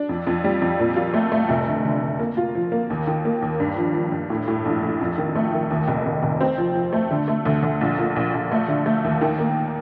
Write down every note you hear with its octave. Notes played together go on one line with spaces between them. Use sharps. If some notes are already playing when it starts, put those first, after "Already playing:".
Already playing: D4
F2
F2
G3
F2
A#2
F4
A3
A3
F1
D3
D3
D3
A#3
F4
F3
A#3
D#2
D#3
A#3
D#2
G2
F3
F3
G2
A2
A2
A#1
A#1
F2
D#3
A3
D#3
D#2
F1
F1
F1
C4
F3
F3
A3
D3
A3
D2
D2
A#1
A#2
A#1
A#1
A3
D3
A3
D#2
D#3
A#3